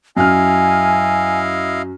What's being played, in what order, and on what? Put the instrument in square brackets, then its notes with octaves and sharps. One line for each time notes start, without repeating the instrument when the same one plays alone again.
[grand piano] F#2 F6 [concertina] E4 D#5 F5 [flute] G#5